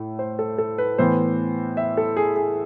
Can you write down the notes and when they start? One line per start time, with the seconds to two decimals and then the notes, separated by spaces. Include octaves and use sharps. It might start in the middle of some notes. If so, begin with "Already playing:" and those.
Already playing: A2 A3
0.19 C5
0.39 A4
0.58 A4
0.78 B4
0.98 A2 E3 B3 C5
1.77 E5
1.97 A4
2.17 G#4
2.36 G#4